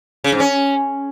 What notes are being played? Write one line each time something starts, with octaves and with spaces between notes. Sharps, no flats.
C#3
G#2
C#4